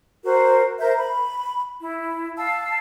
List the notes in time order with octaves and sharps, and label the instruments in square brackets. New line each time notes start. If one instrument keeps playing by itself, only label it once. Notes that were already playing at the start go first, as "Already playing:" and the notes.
[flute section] F#4 A#4 C5
A#4 C5 E5 G6
B5
E4
F5 A5 E6